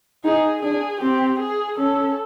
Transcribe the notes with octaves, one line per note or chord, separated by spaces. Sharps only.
D#4 G#4
D4 G#4
C4 G4
G#4
C#4 A4